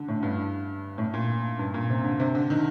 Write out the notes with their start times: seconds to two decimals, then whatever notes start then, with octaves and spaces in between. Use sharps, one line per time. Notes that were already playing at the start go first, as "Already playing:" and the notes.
Already playing: D3
0.08 A2
0.23 G2
0.98 A2
1.14 A#2
1.59 G2
1.74 A#2
1.90 C3
2.04 D3
2.20 C3
2.35 D3
2.50 D#3